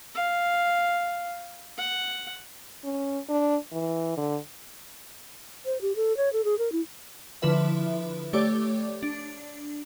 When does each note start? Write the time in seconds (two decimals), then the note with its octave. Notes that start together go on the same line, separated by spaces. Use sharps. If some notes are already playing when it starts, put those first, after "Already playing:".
0.15 F5
1.78 F#5
2.85 C#4
3.29 D4
3.73 E3
4.17 D3
5.66 C5
5.81 G4
5.96 A4
6.17 C#5
6.33 A4
6.45 G#4
6.58 A#4
6.72 E4
7.42 D3 F3 E4 B4 E5
8.33 A3 G4 C#5 D5 D6
9.03 D4